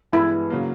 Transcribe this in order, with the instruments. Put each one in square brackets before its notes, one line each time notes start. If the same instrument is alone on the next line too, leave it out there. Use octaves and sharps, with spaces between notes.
[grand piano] G2 E3 G#3 B3 [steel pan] E4
[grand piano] C#3 F#3 A#3